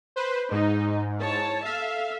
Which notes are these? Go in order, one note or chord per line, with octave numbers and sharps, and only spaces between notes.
B4 C5
G#2 D#4
E4 C#5 A5
A4 E5 F5